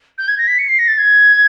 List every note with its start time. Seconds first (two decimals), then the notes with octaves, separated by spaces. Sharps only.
0.18 G6
0.28 G#6
0.38 A#6
0.48 B6
0.58 C#7
0.69 C7
0.79 A#6
0.88 A6
0.98 G#6